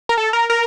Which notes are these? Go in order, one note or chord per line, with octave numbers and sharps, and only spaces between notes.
A#4
A4
A#4
A#4